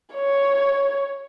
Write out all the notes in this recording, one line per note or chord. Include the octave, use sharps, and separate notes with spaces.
C#5